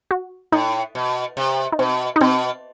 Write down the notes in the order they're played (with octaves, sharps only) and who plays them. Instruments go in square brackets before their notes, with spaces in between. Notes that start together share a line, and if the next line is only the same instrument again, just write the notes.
[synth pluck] F#4
[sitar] A2 [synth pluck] D#4
[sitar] B2
C3
[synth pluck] D#4
[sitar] B2 [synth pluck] C4
[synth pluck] D#4
[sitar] B2 [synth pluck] C4